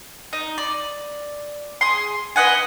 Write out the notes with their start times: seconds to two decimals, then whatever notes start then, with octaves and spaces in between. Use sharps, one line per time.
0.33 D#4
0.58 D5
1.81 G#4 C6
2.36 B4 D#5 F#5 G#5